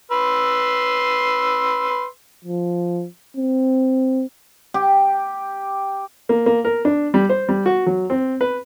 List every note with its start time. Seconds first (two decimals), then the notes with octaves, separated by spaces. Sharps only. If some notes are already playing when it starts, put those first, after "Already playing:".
0.11 B4 C6 E6
2.45 F3
3.37 C4
4.74 G4
6.29 A#3
6.46 A#3
6.65 A#4
6.85 D4
7.14 G3
7.30 C5
7.49 G3
7.66 F#4
7.86 F#3
8.10 C4
8.41 B4